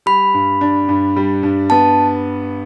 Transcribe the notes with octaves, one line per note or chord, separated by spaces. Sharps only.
G3 B5
G2
D4
G2
G3
G2
B3 A5